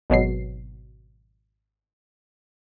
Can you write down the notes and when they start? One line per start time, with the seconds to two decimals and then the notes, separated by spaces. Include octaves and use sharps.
0.10 G#1 B2 F#3 C7